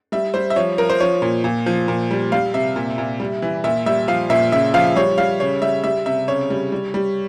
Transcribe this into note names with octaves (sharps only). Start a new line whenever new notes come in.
G3 E5
G3 C5
E5
F3 C#5
F3 A#4
C5
F3 C#5
A#2
A#2
F3
A#2
G3
G3 F5
C3 E5
A#2
A#2
G3
E3
A#2 E5
G3 E5
F3 F5
A#2 E5
C#3 E5
F3 F5
G3 C#5
G3 F5
C#3 C#5
G3 E5
G3 E5
C3 E5
C#3 C#5
G3
G3
G3